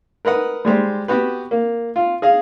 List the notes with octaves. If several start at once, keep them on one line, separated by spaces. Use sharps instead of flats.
A#4 B4 D#5 F#5
G3 G#3 G4 C5
B3 F#4 G4 B4
A#3
F4
G#4 D#5 F5